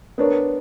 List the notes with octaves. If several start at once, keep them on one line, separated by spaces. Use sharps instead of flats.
B3 D4 A#4 C#5